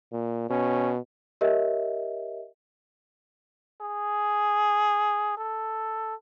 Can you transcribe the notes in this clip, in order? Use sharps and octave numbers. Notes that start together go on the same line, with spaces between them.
A#2
B2 C#4
G4 A#4 C#5 D#5 E5
G#4
A4